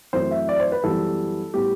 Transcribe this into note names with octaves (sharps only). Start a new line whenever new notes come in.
F#2 E3 A3 C4 C5
E5
D5
C5
B4
F#2 E3 G3 B3 A4
A2 G3 B3 G4